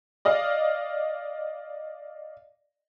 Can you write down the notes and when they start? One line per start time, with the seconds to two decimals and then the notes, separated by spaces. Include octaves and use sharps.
0.25 D5 D#5 F5